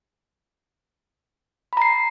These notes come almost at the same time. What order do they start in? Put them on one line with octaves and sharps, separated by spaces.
B5 A#5 C7